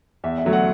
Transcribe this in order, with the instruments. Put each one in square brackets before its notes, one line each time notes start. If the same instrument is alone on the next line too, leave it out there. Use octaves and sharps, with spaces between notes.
[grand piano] E2 E5
E5
D3 F#3 A3
F#5